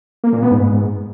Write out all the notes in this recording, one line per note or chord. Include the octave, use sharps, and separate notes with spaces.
A#3
A#2
B3
G#2